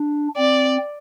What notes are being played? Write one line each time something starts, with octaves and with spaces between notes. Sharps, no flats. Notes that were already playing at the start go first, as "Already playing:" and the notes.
Already playing: D4
C4 D5